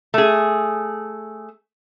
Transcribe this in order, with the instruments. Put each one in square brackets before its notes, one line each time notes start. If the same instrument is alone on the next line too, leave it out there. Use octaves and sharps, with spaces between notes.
[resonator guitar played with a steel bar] A3 G#4